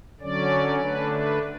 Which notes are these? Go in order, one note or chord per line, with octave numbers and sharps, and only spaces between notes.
D3 F#3 C#4 D5
D3 A3 D4 B4
B4